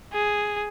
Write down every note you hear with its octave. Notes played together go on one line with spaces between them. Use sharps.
G#4